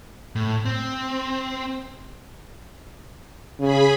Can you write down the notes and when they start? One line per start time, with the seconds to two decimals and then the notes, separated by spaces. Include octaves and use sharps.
0.35 A2
0.66 C4
3.60 C#3 G#4 B5